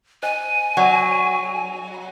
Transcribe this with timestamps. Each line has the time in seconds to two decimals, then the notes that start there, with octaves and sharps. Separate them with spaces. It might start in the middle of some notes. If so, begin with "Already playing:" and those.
0.23 C5 D#5 G#5
0.77 F#3 C5 D5 F#5